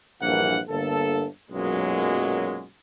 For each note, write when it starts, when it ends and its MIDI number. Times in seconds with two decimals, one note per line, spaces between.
0.22 0.60 34
0.22 0.60 43
0.22 0.60 52
0.22 0.60 58
0.22 0.60 78
0.68 1.25 31
0.68 1.25 50
0.68 1.25 58
0.68 1.25 69
1.50 2.64 35
1.50 2.64 42
1.50 2.64 46
1.50 2.64 54
1.50 2.64 56